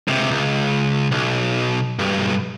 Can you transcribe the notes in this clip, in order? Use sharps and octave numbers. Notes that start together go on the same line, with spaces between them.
C#2 C3
C#2
B1
B1 G2